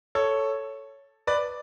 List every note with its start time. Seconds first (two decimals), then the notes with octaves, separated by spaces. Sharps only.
0.15 A4 C#5
1.27 B4 D5